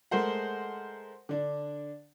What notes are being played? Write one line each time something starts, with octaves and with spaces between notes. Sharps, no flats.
G#3 A3 A#4 C5 F#5
D3 D4